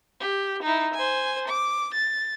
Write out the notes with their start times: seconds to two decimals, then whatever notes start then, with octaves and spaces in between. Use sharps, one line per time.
0.20 G4
0.63 D#4 E4
0.94 C5 G#5
1.48 D6
1.94 A6